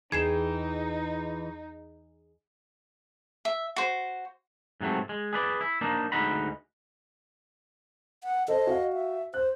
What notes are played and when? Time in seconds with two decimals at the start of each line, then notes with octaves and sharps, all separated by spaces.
0.12 E2 E3 D#4 G#4 G5 G#6 C7 E7
3.45 E5
3.76 F#4 C5
4.81 G#2 C3 F#3 A3
5.09 G#3
5.33 G#4 B4 D5
5.61 E4
5.81 A#3 D4 D#4
6.12 D2 G#3 D#4 F#5 A#5 B5
8.24 F#5
8.48 A4 C5 D#5
8.67 F#4 F5
8.93 E5
9.34 C5 F#6